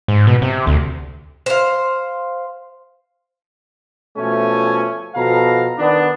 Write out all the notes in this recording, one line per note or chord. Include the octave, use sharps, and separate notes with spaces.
G#2
B2
C3
D2
C5 F5
B2 F3 A3 C#4 G#5
B2 F3 A4 F5 A#5
D#3 B3 D4